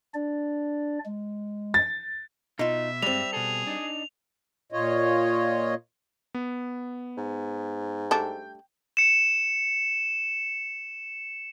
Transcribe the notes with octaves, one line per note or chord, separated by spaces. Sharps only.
D4 D5
G#3
A6
B2 D#4 F4 E5
G2 G3 G#3 C4 F7
B2 G#4 A4
D4 D#4
A#2 F4 C#5 D#5
B3
G#2
G3 A3 D4 G5
C#7 E7